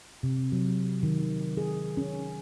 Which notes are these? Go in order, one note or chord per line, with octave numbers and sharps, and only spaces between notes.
C3
F#3
D#3
G#4
C#4